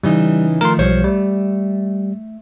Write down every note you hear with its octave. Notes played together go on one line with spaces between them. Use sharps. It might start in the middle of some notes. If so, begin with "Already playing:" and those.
C#3 E3 G3 D#4
D#3 F3 A3 A#4 C6
B1 F3 G3 C5 C#5
G3 A3